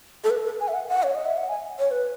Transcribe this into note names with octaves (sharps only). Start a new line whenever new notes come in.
A4
B4
B4
G#5
E5
F#5
F#5
C#5
D#5
E5
F#5
G#5
C#5
B4